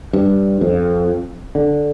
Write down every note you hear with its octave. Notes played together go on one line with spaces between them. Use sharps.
G2
F2
D3